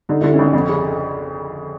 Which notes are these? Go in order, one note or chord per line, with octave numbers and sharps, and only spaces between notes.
D3 D#4
D3 E4
C#4 D#4
G#1
F2
C#3